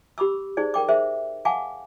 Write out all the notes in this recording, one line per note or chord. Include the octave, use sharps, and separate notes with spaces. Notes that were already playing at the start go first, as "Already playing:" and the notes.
G4 B5 D6 E6
D#4 G#4 C5 D5
A#4 G5 D6
G#4 A#4 C5 E5
F5 F#5 G#5 A5 D6